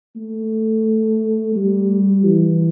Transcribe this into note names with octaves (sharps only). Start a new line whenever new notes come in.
A3
G3
E3